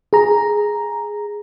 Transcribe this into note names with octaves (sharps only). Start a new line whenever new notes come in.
G#4 A#5